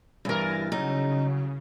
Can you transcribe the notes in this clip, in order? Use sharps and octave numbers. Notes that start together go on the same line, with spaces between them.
G2 B2 E3 A#4 G#5 A6 A#6
C#3 F#3 D#4